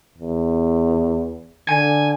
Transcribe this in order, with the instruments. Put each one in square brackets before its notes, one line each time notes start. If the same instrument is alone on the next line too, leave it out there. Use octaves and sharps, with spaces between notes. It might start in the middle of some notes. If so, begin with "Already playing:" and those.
[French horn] E2
[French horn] D3 [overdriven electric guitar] G#5